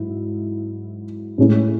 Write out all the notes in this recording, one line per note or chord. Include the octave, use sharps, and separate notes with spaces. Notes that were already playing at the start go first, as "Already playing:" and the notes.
Already playing: G#2 F#3 E4
A2 G#3 C#4 E4